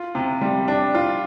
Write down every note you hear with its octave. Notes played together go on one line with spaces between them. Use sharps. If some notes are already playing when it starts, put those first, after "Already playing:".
Already playing: F4
C3
G3
D4
F4